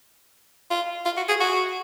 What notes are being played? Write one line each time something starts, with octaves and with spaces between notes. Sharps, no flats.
F4
F4
F#4
G#4
F#4